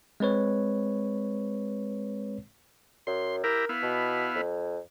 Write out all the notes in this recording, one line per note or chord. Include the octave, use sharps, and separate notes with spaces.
G#3 C4 B4 C#5
F#2 C6
E4 G4 A#4 A#5
B3 E4 F5
B2
F2